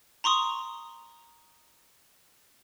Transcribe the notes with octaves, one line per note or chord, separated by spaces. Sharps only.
A#5 C6 C#6 D#6